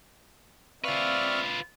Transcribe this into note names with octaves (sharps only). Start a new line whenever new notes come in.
C4 F4 B4 D5 E5 F5 C#6 F6